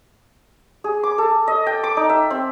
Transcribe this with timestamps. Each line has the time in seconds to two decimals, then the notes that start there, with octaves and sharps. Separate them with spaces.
0.84 G#4
1.03 D6
1.18 A4
1.47 D#5
1.66 G5
1.84 D6
1.97 D#4
2.10 E5
2.30 C4